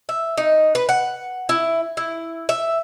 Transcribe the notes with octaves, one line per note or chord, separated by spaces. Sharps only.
E5
D#4
B4
F#5
E4
E4
E5